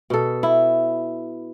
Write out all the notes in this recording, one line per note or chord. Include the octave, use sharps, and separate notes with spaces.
B2 A4
E4